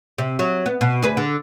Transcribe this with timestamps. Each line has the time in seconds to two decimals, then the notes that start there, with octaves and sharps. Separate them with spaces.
0.18 C3
0.39 F#3
0.66 B3
0.81 B2
1.02 D2 G#4 B4
1.17 D3